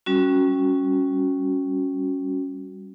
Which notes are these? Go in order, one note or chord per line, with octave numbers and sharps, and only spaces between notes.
G3 C#4 F#4